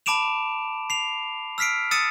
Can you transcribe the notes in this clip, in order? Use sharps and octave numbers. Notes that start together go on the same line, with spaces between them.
A5 B5 D6 D7 E7 F7
C7 F7
E6 F6 B6 C7 D7
D#6 E6 A6 C#7 D#7 E7